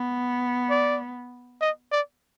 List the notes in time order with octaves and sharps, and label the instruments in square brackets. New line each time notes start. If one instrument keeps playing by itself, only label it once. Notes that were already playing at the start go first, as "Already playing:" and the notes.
Already playing: [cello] B3
[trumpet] D5
D#5
D5